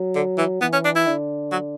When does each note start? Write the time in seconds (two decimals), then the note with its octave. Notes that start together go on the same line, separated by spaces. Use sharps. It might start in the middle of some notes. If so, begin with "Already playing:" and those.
Already playing: F#3
0.15 D3
0.38 E3
0.61 E3 B3
0.73 C#4
0.84 D4
0.96 E4
1.07 D3
1.52 F#3